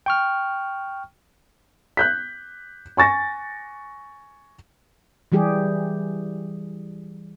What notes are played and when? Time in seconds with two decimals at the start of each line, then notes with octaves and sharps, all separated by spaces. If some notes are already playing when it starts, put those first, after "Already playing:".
0.06 G5 C#6 F6
1.97 F#6 G6 B6
2.97 G#5 C#6 A6 A#6
5.32 E3 G3 G4 G#4